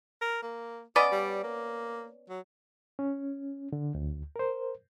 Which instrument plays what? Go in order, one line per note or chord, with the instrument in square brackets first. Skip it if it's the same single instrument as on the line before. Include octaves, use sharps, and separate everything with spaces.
[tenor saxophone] A#4
A#3
[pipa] B3 C#4 D5 [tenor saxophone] D#5
[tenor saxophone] G3
A#3
F#3
[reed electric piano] C#4
D3
D2
A#4 C5